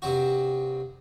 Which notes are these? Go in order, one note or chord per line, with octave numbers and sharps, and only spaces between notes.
G2 C3 C4 F#4